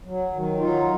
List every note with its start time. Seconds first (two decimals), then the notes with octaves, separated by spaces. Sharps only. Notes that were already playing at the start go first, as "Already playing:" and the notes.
0.05 F#3
0.32 D#3
0.58 F#3 D#4 F4